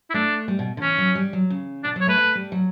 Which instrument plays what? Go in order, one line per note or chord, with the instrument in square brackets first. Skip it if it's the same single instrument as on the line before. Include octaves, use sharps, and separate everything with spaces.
[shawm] E4
[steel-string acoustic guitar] A3 [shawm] D4
[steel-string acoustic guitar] G3
B2
D3
[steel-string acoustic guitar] E3 [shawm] C#4
[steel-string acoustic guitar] F#3
G3
F#3
C#3
[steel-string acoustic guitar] B2 [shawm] D4
[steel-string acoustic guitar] F#3
[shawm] C#5
[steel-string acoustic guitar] A3 [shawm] B4
[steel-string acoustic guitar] A3
G3
F#3